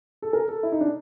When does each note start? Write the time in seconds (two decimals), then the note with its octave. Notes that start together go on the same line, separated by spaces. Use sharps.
0.22 A4
0.33 A#4
0.48 A4
0.63 E4
0.72 D#4
0.81 D4